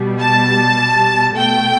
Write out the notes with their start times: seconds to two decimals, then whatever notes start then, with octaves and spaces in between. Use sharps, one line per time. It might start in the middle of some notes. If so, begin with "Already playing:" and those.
Already playing: B2 G3
0.21 A5
1.37 B2 A3 G5